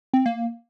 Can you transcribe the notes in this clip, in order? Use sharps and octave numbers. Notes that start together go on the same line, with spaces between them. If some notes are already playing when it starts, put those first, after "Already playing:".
C4
A#3